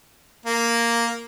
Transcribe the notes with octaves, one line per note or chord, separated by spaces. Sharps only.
A#3